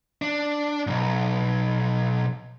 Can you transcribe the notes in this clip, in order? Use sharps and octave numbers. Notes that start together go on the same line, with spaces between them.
D4
B1 G#2